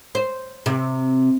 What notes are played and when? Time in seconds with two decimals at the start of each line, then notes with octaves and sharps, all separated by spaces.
0.15 C5
0.66 C3